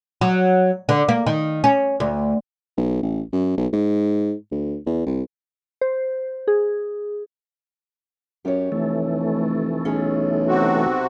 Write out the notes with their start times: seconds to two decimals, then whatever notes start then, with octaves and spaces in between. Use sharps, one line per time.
0.21 F#3
0.89 D3
1.09 A#3
1.27 D#3
1.64 C#4
2.00 D2
2.77 B1
3.03 A1
3.33 F#2
3.57 B1
3.73 G#2
4.51 D2
4.87 E2
5.06 C2
5.81 C5
6.48 G#4
8.45 F#2 G4 C#5
8.72 F1 E3 A3
9.85 B1 C#4 G#4
10.48 C3 C4 F#4